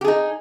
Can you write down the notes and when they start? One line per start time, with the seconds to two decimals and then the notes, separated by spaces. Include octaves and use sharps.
0.01 G4
0.05 G#4
0.08 D#4